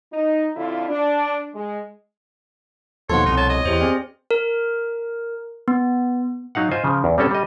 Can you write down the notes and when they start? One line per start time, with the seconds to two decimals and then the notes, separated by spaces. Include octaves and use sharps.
0.12 D#4
0.56 F2 D3 E4 F4
0.89 D4
1.53 G#3
3.10 D#2 B2 F3 A4 C#5 F#5 C6
3.26 C2 D#4
3.37 C#5 A5
3.50 D#5
3.65 E2 G4 C5
3.81 C4 G#4 D5
4.31 A#4
5.68 B3
6.55 F#3 D#4 F5 F#5
6.71 F4 C5 D#5 G#5
6.84 C#3 F3
7.04 E2
7.18 G3 C4 C#4 A4
7.31 G3 D#5